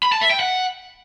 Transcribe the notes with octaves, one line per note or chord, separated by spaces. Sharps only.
B5
A5
E5
G5
F#5